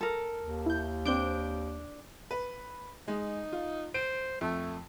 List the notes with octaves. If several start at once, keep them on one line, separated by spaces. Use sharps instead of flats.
A4 A#4
D#2
E4 G6
C4 D4 G6 D7
B4
G#3 D#4
F4
C5 D7
F2 A3